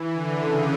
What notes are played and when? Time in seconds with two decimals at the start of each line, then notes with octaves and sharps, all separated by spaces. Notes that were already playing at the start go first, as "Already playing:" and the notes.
Already playing: E3
0.14 D3
0.43 C#3